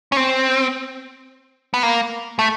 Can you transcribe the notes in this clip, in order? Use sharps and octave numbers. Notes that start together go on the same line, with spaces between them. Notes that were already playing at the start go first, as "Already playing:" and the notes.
C#4
C4
B3
A#3
A3